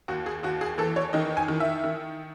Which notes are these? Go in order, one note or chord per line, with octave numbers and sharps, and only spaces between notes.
D#2 F#4
G#4
D#2 F#4
G#4
E3 A4
C#5
D#3 D#5
G#5
D#3
E5
D#3